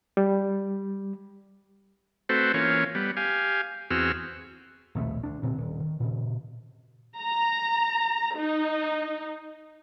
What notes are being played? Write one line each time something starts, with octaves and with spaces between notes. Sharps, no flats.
G3
A3 C4 F#4 A4 B4 C5
E3 A#3 C#4 F4 C#5
G3 B3
G4 F5 G#5
E2 C4 F#4 G#4 E6 F6
A#1 D#2 B2 A3
D2 D4
D2 A#2 D3 C4
D#1
D#3
A#2 C#3
A#5
D#4